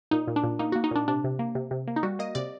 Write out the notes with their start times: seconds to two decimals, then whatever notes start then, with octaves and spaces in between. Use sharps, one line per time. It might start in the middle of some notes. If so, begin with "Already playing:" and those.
0.11 A#2 D#4
0.27 A#2
0.36 D4
0.44 A#2
0.59 A#3 D#4
0.72 A#3 F#4
0.84 D#4
0.91 A#2 D4
1.08 C3 D4
1.24 C3
1.39 A#3
1.55 C3
1.71 C3
1.88 A#3
1.96 D#4
2.03 G3 F#4
2.19 A#3 D#5
2.35 C3 D5